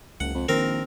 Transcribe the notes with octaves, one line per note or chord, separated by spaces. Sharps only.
F#1 C#2 F#5
F2
A#1 D#3 C4 A#4